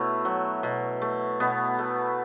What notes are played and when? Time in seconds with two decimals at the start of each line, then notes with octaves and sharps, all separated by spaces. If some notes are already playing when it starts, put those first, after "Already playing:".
Already playing: B2 A3 E4 C#5
0.25 F#3
0.63 B2
1.02 A3
1.40 B2 B3
1.79 A3